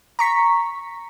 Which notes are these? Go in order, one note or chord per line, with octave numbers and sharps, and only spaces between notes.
A#5 C#6 B6